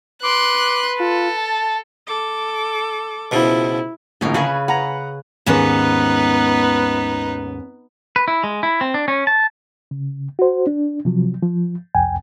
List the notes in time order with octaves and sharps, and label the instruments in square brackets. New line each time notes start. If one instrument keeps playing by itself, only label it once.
[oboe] B4 [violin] C6 F#6 [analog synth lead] D6
[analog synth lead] F4 [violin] A4
[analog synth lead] A5
[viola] A4 D6
[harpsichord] C#2 B2 F3 [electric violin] E4
[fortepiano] A#1 A2 [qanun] D3 C#4 A#4
[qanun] C#3 G#4 B4 [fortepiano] C#6
[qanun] B4 [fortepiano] F#5 A#5
[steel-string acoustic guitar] D#2 G#2 C#4 [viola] B3 [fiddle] D#4 B4
[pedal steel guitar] B4
E4
G#3
E4
C4
D4
C#4
A5
[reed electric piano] C#3
F#4 C5
D4
C3 F3 F#3
F3
C2 F2 G5 G#5